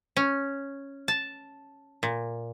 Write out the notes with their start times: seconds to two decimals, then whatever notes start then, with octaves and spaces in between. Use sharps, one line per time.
0.17 C#4
1.08 A5
2.03 A#2